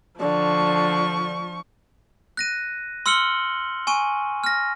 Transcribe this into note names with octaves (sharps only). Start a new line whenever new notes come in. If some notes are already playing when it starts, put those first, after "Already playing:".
D3 F3 C#6
F#6 A#6 D#7
C6 E6 F6 C#7 F#7 G7
G#5 C#6 D#7
F6 A#6